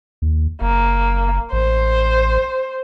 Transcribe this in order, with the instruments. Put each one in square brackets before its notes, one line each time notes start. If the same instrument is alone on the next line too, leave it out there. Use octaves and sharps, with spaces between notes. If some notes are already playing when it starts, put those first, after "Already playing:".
[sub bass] D#2
[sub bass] F#1 [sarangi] A#3
[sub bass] A1 [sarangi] C5